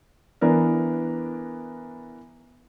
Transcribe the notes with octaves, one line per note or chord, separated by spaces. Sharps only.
E3 B3 D4 A#4